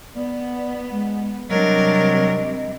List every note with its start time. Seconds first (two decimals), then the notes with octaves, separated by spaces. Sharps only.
0.15 B3 D5
0.91 G#3
1.50 C3 F#3 G3 D4 A#4 D#5